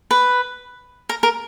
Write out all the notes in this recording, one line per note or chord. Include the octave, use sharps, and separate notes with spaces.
B4
A#4
A#4